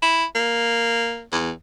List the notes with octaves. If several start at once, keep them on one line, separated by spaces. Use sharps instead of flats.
E4
A#3
E2